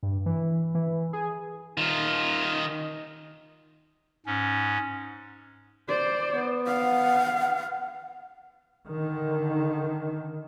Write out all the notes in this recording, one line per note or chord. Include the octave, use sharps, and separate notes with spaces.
G2
E3
E3
G#4
D#3 F4
G#2 C#4
C5 D5
B3
F5 F#5
D3 D#3